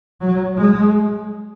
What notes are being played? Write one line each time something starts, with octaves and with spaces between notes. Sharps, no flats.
F#3
G#3